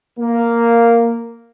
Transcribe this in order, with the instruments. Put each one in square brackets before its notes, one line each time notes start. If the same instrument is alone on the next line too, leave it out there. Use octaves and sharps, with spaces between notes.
[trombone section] A#3